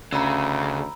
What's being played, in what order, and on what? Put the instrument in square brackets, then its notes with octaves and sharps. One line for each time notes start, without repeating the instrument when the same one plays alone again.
[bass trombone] D2 [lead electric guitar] C#3 [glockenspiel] A#5 B5 E6